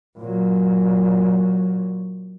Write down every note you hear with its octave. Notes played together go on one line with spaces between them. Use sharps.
A#2 F#3